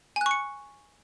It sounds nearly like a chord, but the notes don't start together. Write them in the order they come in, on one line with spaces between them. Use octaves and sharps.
G#5 F#6 C#6 C#7